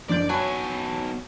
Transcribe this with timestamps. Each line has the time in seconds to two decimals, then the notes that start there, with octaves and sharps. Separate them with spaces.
0.09 F#1 F3 D4 D5 G6 D7
0.29 B1 F#3 C#5 G#5 A5 B5